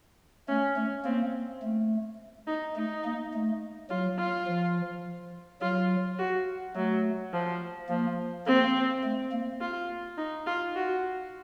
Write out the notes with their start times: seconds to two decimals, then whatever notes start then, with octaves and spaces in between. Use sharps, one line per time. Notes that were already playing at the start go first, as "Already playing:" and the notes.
0.49 A3 C#4
0.76 A3 C#4
1.05 A#3 C4
1.62 A3
2.47 D#4
2.76 A3 D#4
3.05 A#3
3.34 A3
3.90 F#3 F4
4.18 F4
4.47 F3
5.62 F#3 F4
6.19 F#4
6.76 F#3 A3
7.33 F3
7.89 F3 A#3
8.47 A#3 C4
9.04 A3
9.32 A#3
9.61 F4
10.18 D#4
10.47 F4
10.75 F#4